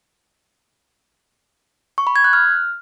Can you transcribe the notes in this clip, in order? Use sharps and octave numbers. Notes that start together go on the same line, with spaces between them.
C#6
B5
G#6
F#6
F6